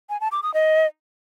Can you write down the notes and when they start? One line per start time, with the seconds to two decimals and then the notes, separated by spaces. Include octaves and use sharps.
0.10 G#5
0.21 A5
0.32 D6
0.43 D#6
0.54 D#5